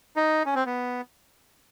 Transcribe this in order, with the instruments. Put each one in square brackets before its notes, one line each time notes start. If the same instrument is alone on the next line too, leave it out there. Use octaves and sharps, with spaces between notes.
[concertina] D#4
C#4
C4
B3